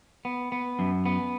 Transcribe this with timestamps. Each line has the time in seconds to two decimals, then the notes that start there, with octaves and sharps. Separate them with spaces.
0.25 B3
0.52 B3
0.79 F#2
1.06 B3